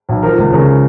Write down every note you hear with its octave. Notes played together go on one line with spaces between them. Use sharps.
B1
F3 A#4
C#2
C#3 A#4